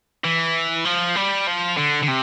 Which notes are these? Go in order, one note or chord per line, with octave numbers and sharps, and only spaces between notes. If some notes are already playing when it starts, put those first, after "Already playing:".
E3
F3
G3
F3
D3
D3
C3